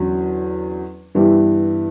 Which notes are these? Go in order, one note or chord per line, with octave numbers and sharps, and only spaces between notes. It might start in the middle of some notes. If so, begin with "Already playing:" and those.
Already playing: E2 D3 F#3 C#4
G2 E3 B3 E4 G4